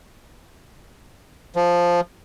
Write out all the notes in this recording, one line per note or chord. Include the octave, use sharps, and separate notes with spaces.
F3